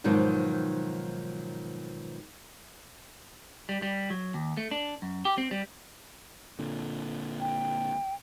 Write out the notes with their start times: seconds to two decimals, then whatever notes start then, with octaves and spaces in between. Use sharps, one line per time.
0.04 G#2 B2 D#3 F3 F#3
3.69 G3
3.82 G3
4.10 F#3
4.34 D#2
4.57 A3
4.71 D4
5.02 F#2
5.25 G4
5.38 C4
5.51 G3
6.59 A#2 D3
7.41 G5